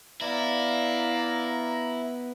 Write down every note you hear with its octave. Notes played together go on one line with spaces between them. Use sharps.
B3 E4 D5 F5 A#5